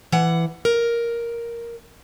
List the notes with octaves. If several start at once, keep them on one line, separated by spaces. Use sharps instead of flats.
E3 F#5
A#4